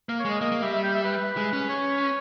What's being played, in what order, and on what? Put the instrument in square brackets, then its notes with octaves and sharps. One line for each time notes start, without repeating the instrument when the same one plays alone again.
[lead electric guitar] A#3 [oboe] A#4
[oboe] C#5
[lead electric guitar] G#3
[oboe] D#5
[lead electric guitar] A#3 [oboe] D#5
[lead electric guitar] A#3
[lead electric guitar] G3 [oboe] E5
[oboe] E5
G5
E5
B4
[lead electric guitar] G#3
C#4
[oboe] C#5